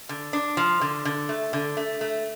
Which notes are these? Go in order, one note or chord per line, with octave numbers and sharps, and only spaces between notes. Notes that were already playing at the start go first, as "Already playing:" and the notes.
D3
D4
F3
D3
D3
A3
D3
A3
A3